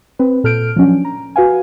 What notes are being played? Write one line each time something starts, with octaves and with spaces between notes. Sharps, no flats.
C4 B4
A#2 A4 F6 G6 D7
F3 F#3 C#4 D4
A#5
F#4 B4 F5 G#5